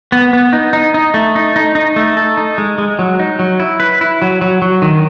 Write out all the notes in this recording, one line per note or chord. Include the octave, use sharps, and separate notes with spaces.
B3
B3
D#4
D#4
D#4
A3
D#4
D#4
D#4
A3
A4
D#4
G#3
G#3
F#3
D#4
F#3
E4
B4
E4
F#3
F#3
F#3
D#3